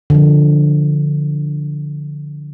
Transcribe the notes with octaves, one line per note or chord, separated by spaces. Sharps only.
D3 F3